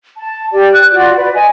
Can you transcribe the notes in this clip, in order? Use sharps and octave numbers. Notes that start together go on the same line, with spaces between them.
A5
G4 D5
F#6
F4 F#4 D5
B4 D5
D#5 G#5